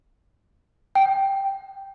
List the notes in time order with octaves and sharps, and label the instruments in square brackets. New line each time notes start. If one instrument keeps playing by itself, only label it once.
[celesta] G5